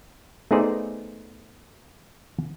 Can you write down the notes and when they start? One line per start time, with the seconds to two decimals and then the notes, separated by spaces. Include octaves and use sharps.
0.51 A3 B3 D#4 G#4 C5 D5